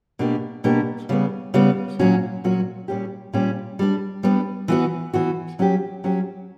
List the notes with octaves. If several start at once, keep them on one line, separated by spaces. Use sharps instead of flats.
B2 A#3 D4 G4
B2 A#3 D4 G4
C#3 G3 B3
C#3 G3 B3
A#2 F#3 C#4 F#4
A#2 F#3 C#4 F#4
A#2 G3 C#4 G4
A#2 G3 C#4 G4
G3 B3 D4
G3 B3 D4
E3 B3 F#4
E3 B3 F#4
F#3 C#4 G4
F#3 C#4 G4